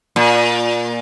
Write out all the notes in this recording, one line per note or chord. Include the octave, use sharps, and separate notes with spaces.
A#2